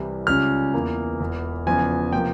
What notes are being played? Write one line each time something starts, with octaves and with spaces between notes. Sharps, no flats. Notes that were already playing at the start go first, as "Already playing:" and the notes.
Already playing: C2 C3 E3 G3 C4
C#2 C#3 G3 C#4 F6
E2 E3 A#3
E1 E2 E3
E1 E2 C#3 F3 G#5
C3 F3 A#3 G5